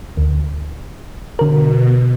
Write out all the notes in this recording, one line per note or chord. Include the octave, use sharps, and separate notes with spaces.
D2
B2 D3 A#4